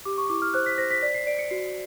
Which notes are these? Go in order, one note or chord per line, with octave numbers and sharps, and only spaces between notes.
G4 D6
C#6
E4 D6
F6
C5 F#6
B6
C5 A#6
B6
D5 B6
C7
D5 D7
C#7
F#4 C7